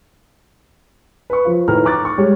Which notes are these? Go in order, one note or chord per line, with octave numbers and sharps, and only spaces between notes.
B4 C#6
F3 F4
A2 D#3 B4 A#5 F6
A#5 C#6 D6 F#6 A6
C#6
G3 G#3 G4 C#5